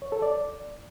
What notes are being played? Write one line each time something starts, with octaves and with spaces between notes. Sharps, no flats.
C#5
A4
D5